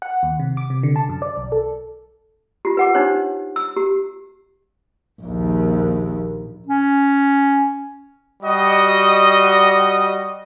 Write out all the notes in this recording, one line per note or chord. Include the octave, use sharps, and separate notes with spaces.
F#5
D#2
C3
D6
C3
D3
A5
F#2
D5
B1
A4
F4 G4
B4 F#5 D6
D4 D#4 G4 C5 C#5
E6
G4
A#1 D#2
C#4
G3 F#4 D#5